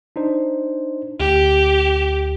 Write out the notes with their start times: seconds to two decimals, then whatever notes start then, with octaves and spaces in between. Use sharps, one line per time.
0.16 D4 D#4 C5
1.20 D2 G4